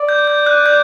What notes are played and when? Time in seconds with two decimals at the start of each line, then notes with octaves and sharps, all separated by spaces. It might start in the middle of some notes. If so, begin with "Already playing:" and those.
Already playing: D5
0.09 G6
0.27 G6
0.46 F#6
0.66 G6